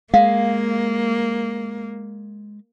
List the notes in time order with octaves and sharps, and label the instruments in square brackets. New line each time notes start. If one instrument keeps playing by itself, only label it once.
[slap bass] G#3 [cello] A#3 [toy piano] F5